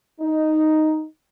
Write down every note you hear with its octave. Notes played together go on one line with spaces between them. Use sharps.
D#4